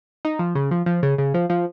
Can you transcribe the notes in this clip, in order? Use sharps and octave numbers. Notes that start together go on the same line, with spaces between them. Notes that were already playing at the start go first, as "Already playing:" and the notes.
D#4
F3
C#3
F3
F3
C#3
C#3
F3
F3